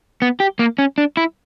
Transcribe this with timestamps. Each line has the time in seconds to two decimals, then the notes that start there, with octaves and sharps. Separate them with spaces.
0.22 B3
0.40 G4
0.59 A#3
0.79 C#4
0.98 D4
1.17 E4